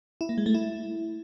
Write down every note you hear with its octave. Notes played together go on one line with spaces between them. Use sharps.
E4
A#3
G#3
A3
E4